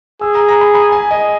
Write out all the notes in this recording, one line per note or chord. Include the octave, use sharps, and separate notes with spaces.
G#4 E6
A#5
A#5
B5
B5
G#5
D#5